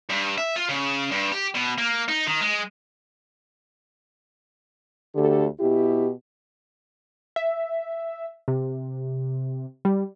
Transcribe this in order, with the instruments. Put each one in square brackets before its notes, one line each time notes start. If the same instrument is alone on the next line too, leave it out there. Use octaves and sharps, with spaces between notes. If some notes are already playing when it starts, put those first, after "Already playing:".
[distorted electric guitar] G2
E5
F4
C#3
G2
G4
B2
A#3
D#4
D#3
G#3
[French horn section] D2 D3 G4 A4
B2 E4 G4
[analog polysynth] E5
C3
G3